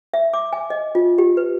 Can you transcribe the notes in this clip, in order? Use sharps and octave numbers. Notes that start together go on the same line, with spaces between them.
E5
D6
G#5
D#5
F4
G4
B4